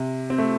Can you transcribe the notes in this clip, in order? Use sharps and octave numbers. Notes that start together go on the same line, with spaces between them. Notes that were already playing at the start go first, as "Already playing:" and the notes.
Already playing: C3
C4
A3